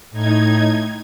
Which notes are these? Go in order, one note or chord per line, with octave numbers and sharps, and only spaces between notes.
A2 D#4 G#6